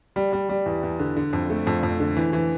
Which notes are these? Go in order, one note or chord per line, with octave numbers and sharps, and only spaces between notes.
G3
G3
G3
E2
E2
D3
D3
F2
A3
F2
F2
D3
E3
E3